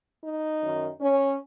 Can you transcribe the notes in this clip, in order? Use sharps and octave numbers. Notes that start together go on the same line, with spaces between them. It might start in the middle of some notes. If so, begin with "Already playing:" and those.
D#4
F#2 D#3
C#4